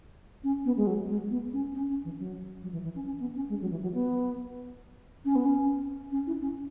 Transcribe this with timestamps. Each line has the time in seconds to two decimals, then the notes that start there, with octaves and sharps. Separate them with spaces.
0.44 C#4
0.65 B3
0.77 G#3
0.87 F#3
1.09 G#3
1.31 B3
1.53 C#4
1.74 C#4
1.89 C#4
2.04 E3
2.19 F#3
2.62 F#3
2.73 E3
2.84 E3
2.95 C#4
3.06 C#4
3.20 B3
3.35 C#4
3.49 G#3
3.61 F#3
3.71 E3
3.82 F#3
3.94 B3
5.25 C#4
5.35 B3
5.46 C#4
6.12 C#4
6.27 E4
6.41 C#4